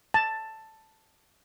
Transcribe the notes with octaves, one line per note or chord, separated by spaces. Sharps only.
A5